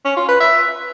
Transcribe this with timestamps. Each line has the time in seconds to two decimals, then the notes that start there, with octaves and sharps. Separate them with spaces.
0.05 C#4
0.17 F4
0.28 B4
0.40 E5